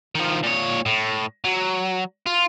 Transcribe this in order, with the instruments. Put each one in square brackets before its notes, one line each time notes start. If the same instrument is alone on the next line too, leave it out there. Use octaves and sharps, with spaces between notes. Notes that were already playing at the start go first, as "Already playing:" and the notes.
[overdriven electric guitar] D#3 F3
A#2 C#5
A2
F#3
F4